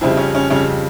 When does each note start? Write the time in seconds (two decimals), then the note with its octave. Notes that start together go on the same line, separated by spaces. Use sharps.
0.01 F2 C#3 G3 C4 E4
0.17 C#4
0.35 C#4
0.50 F2 C#3 G3 C#4